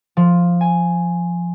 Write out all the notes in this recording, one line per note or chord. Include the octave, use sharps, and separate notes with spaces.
F3
G#5